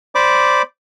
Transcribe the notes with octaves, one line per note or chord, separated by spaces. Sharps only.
C5 D5 B5 D6